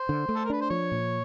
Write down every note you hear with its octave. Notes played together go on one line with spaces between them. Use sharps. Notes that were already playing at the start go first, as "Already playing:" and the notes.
Already playing: C5
D3
A3
A4
A#4
D4 B4
C5
F3 C#5
A#2